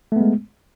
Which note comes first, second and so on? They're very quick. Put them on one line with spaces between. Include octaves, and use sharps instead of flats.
A3 B3 G#3